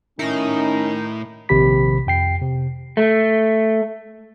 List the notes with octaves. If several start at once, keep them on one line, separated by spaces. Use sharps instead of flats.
A2 D#3 C#4 D#4 E4
A#1 C3 D#3 G4 B5 B6
F2 G5 C7
C3
A3